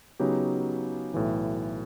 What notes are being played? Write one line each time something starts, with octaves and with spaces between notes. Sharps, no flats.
C#3 F#3 B3 D#4 G4
B1 A2 E3